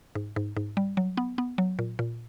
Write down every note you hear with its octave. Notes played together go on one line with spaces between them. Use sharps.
G#2
G#2
G#2
G3
F#3
B3
B3
F#3
A#2
A#2